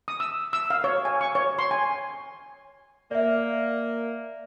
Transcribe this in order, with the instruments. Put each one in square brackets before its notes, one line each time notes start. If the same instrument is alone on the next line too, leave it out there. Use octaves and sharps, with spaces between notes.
[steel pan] D#6
E6
E6
F5
C#5
G#5
C#6
C#5
C6
G#5
[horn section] A#3 [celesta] D5 E5